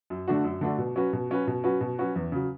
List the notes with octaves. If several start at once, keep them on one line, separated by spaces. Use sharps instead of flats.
F#2
D3 A3 D4 F#4
F#2
D3 A3 D4 F#4
B2
F#3 C#4 F#4 B4
B2
F#3 C#4 F#4 B4
B2
F#3 C#4 F#4 B4
B2
F#3 C#4 F#4 B4
E2
C#3 F#3